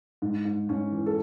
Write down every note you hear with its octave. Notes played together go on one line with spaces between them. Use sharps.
G#2
G#2
G#2 C#4
E3
A4